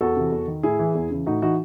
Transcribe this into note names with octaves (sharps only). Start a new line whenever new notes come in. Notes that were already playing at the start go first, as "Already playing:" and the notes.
E2 F#4 A4
C3 E3
E2
D#3
A2 E4 G#4
E3
E2
C#3 E3
A2 D#4 F#4
E3 D#4 F#4